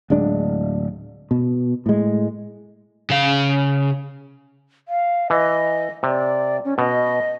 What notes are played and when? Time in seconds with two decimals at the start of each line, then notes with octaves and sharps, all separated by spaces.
0.10 D1 G#3 D4
1.31 B2
1.86 A2 G#3
3.10 C#3 F5
4.88 F5
5.30 E3 D#5
6.03 C3 D5
6.65 C#4
6.78 B2 D#5